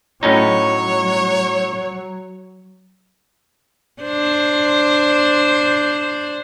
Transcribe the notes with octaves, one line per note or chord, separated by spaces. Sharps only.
A2 F#3 C#4 D#4 C#5
D4 C5